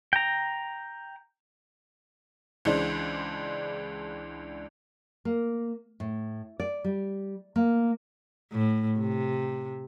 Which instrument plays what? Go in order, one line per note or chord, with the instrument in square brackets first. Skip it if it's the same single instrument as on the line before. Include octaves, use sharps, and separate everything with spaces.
[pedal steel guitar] G5 A#5
[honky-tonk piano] C#2 E3 G#3 D4 C5
[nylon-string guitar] A#3
A2
D5
G3
A#3
[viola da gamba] A2
C3